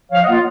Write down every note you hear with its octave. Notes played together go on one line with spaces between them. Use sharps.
F3 C#5 F5
D#5 F#5
A#3 F4